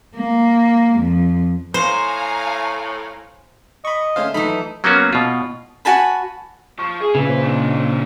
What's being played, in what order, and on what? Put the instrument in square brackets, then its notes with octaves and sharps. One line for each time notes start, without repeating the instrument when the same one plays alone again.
[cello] A#3
F2
[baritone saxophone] A2 [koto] C5 [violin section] F5 G#5 A#5
[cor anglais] D#5 [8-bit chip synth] B5 C#6
[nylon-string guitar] D2 A3 E5 [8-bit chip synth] C#4 C5 F5
[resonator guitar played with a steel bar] E3 D#4 [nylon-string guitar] F#3 A3 F4 [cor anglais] A4 [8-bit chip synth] B5
[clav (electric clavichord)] F#3 A#3 B3 C#4 F#4
B2 F4
[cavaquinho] F#4 G#5 A5 B5
[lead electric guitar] F3 F4 [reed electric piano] C#6
[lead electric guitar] G#4
[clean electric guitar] A#2 C#3 [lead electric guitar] E3 B4
[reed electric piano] C5
[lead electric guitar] C4 D4